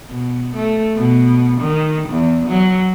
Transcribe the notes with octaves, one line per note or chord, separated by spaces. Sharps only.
B2
A3
B2
D#3
E2
F#3